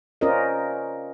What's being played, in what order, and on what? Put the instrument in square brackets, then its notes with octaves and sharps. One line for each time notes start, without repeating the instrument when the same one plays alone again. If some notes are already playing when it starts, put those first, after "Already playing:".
[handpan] C#4 F4 A#4 C5 D5 D#5